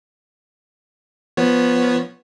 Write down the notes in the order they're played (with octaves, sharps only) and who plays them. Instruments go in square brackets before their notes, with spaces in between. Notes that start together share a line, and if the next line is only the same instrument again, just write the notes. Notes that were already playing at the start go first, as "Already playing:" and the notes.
[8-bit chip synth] F3 B3 C#5